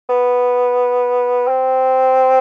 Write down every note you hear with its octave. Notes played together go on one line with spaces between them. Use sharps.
B3
C4